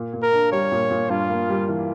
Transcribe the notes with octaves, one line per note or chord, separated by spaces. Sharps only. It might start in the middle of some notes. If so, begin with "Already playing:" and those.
Already playing: A#2
A#2
A#4
D4
G3 C#5
A#2
A#2
G2 F4
A#3
G3
E3